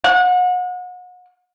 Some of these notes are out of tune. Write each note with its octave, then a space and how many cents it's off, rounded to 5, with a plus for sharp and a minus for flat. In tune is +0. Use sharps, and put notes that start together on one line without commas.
F#5 -35